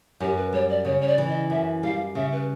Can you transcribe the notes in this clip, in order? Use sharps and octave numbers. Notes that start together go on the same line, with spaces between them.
F#2 G4
B4
G3 C#5
D5
C#3 C#5
C#5
D5
E3
D#5
F#2 E5
G3 F5
C#3 E5
B4